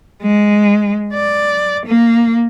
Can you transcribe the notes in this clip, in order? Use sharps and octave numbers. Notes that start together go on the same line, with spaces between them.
G#3
D5
A#3